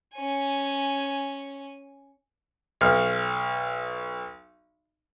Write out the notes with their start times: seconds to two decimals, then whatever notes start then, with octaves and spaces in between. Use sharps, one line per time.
0.14 C#4 G#5
2.81 B1 F6